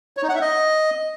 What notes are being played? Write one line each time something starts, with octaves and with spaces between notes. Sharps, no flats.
C#5
D#4
F#5
E5
D#5